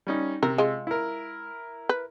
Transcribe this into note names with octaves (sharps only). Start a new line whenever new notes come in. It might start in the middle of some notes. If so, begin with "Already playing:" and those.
G3 C#4 D#4
C3 A#4
G#3 F4
E4 A#4
B4